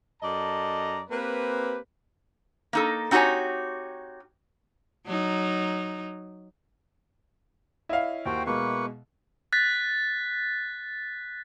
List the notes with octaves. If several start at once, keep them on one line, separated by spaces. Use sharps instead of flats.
F#2 A4 D5 D#5 A5 A#5
A#3 C4 G4 B4
A#3 D#4 A4
C4 D#4 F#4 G4 C#5 G#5
F#3 D#4
E4 C#5 D#5 F5
D#2 F#4 C5 G5
B2 G#3 A#3 B4 C#6
F#6 A6 B6